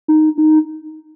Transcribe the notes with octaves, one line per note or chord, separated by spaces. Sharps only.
D#4
D#4